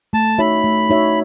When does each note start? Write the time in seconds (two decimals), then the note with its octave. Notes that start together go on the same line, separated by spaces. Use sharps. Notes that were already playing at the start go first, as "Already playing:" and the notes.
0.13 A3 A5
0.39 D#4 F#4 C#5 E5 B5
0.64 A3
0.90 D#4 F#4 C#5 E5